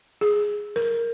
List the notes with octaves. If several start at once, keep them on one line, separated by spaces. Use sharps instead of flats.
G#4
A#4